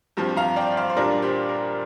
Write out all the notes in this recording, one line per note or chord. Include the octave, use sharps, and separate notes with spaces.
G2 F3 C4 G4
F5 A#5
D5 G5
C5 F5
C5
A#2 G3 D4 F4 A#4 D5
G4 C5
A#4